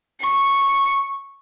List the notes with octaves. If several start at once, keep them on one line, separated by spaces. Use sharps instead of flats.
C#6